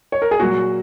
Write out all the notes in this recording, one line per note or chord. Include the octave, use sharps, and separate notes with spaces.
C#5
A#4
G#4
A#2 F#3 F#4